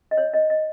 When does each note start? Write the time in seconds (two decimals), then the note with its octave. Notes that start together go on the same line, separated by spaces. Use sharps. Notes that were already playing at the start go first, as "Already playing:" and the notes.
0.11 D#5
0.17 C#5
0.33 D#5
0.50 D#5